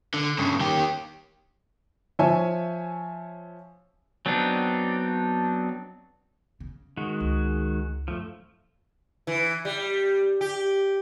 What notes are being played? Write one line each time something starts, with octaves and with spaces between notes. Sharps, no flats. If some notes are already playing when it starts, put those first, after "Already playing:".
D3
G2 C#3
D#3 G4
F3 C#5 E5 G#5
F#3 B3 C4 D4 D#4
C#3
D#3 G#3 F#4
C#2
F#2 F3 A3
E3
G3
G4